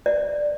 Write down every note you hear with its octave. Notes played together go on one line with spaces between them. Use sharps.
D5